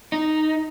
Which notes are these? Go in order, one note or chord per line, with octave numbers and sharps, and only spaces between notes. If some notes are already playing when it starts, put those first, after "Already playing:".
D#4